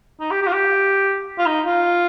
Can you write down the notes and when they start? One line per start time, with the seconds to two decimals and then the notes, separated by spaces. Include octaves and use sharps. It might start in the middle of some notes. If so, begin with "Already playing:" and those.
0.20 D#4
0.31 G4
0.42 G4
0.47 F4
0.53 G4
1.39 F4
1.46 D#4
1.66 F4